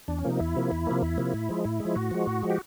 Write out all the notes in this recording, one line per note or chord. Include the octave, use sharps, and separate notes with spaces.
E2 D4
C#4
C3 F3 A#3 D#4
E2 E4
C3 F3 A#3
E2
C3 F3 A#3
E2 E4
C3 F3 A#3
A2
F3 G#3
A2 E4
F3 G#3
A2 F#4
F3 G#3
A2
F3 G#3
G4